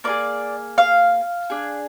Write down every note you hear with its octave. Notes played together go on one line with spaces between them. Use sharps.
A#3 F4 G#4 D5
F5
D4 G#4